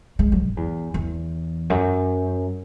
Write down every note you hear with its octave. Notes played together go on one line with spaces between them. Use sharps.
G#3
F#3
G#2
E2
E2
F#2